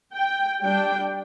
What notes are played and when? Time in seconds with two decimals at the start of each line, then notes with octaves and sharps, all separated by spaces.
0.16 G5
0.61 G3 D4 G5